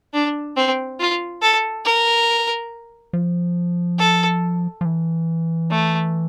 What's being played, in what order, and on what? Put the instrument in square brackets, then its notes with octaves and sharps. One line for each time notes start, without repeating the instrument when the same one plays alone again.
[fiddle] D4
C4
F4
A4
A#4
[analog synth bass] F3
[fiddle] A4
[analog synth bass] F3
E3
[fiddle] A3